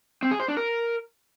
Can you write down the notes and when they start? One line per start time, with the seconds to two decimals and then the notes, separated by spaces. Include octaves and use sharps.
0.23 C4
0.31 G#4
0.40 C5
0.48 D4
0.57 A#4